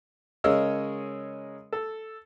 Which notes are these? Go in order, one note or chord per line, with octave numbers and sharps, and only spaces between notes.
C#3 G#3 A#4 C#5 D#5 E6
A4